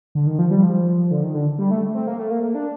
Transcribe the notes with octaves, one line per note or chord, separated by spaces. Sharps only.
D3
D#3
F3
G3
F3
D3
D#3
D3
G3
A3
C4
A#3
A3
A#3
A#3
D4